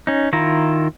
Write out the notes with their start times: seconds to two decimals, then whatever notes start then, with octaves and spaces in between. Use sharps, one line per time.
0.07 C#4 D#4
0.33 D#3 E4 F4 A#5